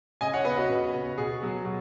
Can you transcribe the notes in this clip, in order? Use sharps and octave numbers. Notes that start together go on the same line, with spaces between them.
C#3 D#5 G#5
C#5 F#5
B3 B4 D#5
F#4 B4
C#3
B3
B2 G#4
F#3 B3
B2